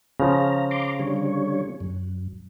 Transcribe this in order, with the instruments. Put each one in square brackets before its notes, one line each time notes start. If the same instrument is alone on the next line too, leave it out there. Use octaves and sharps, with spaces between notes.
[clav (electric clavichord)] C#3 F3 [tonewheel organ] A#5
[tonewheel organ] A#5 C6 D6
D3 G3 C#5
F#2